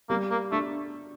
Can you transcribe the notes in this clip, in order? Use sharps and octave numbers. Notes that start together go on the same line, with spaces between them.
G3 A#3
A#3
A3 D4